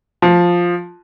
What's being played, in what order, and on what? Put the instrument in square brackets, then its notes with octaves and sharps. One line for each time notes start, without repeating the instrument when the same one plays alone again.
[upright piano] F3